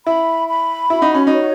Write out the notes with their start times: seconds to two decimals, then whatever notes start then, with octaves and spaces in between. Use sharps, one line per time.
0.06 E4 B5
0.48 B5
0.90 E4 F#4
1.02 D#4
1.14 C#4
1.27 D#4
1.32 C#5